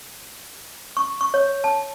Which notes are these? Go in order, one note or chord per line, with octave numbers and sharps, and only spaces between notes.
C#6
C#6
C#5
A5